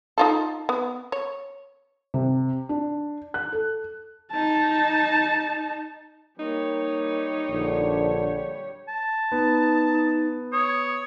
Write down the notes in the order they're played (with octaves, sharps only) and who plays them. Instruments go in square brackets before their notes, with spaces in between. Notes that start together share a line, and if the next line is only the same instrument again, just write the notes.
[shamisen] D#4 F4 A4
B3
C#5
[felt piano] C3
D4
F#6
A4
[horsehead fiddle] D#4 A5
[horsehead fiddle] G3 C#5 [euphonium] A#3 [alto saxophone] D#4
[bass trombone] A#1 [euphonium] D3
[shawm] A5
[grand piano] B3 [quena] D#4
[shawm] C#5 [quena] D#6